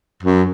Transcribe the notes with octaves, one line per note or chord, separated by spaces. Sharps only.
F#2